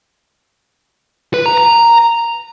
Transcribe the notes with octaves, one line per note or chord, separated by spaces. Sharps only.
B4
A#5
A#5